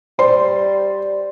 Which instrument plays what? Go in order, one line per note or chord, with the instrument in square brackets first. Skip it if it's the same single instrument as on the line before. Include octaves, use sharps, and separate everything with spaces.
[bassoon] G3 [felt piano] C5 C6